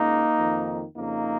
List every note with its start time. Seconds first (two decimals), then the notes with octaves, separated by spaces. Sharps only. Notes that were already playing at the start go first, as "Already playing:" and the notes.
Already playing: C#2 C#3 A#3 D#4
0.37 F2 D#3
0.96 F2 C#3 A#3 D#4